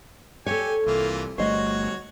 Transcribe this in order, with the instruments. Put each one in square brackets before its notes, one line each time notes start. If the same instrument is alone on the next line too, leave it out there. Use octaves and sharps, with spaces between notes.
[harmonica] G4 G#5 [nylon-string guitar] A4 C#5
[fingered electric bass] C2 [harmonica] E3 A#3 F4
[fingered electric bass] G1 G3 A3 [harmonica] F#4 C#5 [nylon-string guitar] C5 D#5